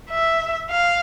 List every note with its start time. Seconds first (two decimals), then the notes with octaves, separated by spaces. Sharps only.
0.10 E5
0.70 F5